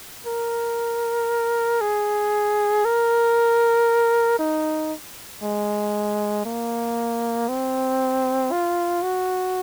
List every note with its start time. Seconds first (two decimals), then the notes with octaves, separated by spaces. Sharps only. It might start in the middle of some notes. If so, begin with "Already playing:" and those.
0.27 A#4
1.81 G#4
2.85 A#4
4.39 D#4
5.43 G#3
6.45 A#3
7.49 C4
8.52 F4
9.03 F#4